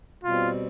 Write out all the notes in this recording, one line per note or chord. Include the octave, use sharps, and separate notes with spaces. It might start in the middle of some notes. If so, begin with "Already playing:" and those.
B2 G3 C4 F4